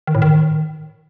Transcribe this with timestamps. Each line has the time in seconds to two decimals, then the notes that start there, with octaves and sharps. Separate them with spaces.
0.07 D#3
0.15 A2
0.22 D#3